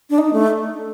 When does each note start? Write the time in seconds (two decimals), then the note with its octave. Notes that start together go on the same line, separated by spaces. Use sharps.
0.10 D4
0.18 D#4
0.33 A3